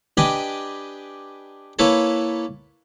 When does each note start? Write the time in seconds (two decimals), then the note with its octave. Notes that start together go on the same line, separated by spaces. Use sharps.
0.17 D4 G4 B4 D#5 G5 G#5
1.79 A#3 E4 A4 B4 C#5 A5